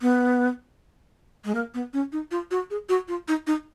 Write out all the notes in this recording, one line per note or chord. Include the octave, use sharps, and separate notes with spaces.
B3
G#3
A#3
B3
C#4
D#4
F4
F#4
G#4
F#4
F4
D#4
D#4